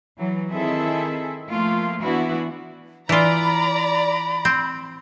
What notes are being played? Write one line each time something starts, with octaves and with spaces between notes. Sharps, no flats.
E3 F#3
D#3 C4 E4 G#4 A4 E5
F3 A3 A#3 F4
E3 B3 D4 E4 F#4
E3 F4 D5 A#5 B5
C4